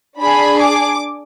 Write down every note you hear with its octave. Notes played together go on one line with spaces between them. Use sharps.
D4 G#4 B5
D6